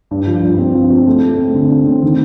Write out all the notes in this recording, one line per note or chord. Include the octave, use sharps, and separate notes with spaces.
G2
F3
G2
C4
F3
C4
A3
A3
C4
D3
C4
C4
D#3